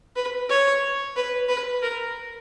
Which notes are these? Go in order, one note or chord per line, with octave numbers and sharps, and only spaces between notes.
B4
C#5
B4
B4
A#4